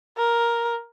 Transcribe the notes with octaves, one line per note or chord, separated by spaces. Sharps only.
A#4